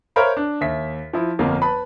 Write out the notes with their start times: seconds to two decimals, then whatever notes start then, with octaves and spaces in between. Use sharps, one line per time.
0.16 A#4 C5 C#5 E5 F5 B5
0.37 D4
0.61 D#2 E5 B6
1.13 F3 E4
1.39 G1 F2 A#3 F5
1.62 B4 A5 B5